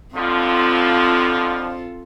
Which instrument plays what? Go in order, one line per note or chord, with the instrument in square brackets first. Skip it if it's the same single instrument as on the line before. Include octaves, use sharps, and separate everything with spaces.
[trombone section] F2 D3 F3 [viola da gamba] C4 F4 A4